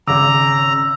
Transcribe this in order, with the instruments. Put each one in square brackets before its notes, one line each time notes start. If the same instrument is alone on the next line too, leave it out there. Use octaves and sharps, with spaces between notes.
[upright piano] G#1 D6 [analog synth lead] C#3 [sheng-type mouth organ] A#5 [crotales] E6